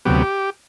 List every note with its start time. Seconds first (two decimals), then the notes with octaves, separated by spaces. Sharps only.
0.05 D2 C3 F#3 B3 G4